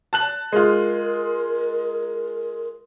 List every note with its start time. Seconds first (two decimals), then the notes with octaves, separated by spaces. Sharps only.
0.13 A5 F#6 F#7
0.52 G#3 F4 A#4